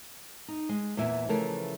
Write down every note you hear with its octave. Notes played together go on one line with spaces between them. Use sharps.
D#4
G#3
E2 A#2 E4 E5 G#5
C#3 E3 F3 A3 G#4 A#4